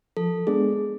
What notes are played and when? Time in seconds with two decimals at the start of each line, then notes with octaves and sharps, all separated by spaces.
0.17 F3 A4
0.47 G#3 B3 D4 G#4